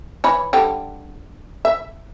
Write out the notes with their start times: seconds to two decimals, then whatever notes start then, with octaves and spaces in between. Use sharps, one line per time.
0.24 E3 C#5 B5
0.53 D3 G3 G5
1.65 E5